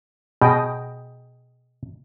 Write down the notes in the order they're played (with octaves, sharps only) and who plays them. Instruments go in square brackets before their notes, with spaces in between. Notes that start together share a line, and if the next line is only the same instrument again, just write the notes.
[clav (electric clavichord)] B2 [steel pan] G#4 D#5 G5